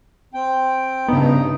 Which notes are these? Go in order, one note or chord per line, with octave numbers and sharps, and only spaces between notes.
C4 G5
G2 C#3 B3 D#4